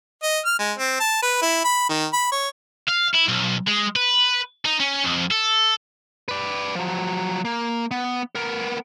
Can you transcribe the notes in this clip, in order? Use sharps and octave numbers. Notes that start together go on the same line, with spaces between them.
D#5
F6
G#3
C4
A5
B4
E4
B5
D#3
B5
C#5
F5
E4
B1
G#3
B4
D#4
C#4
F2
A4
B4 D5
F3 F#3
A#3
B3
B3 A#4